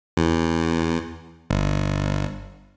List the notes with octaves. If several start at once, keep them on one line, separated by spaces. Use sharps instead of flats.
E2
G1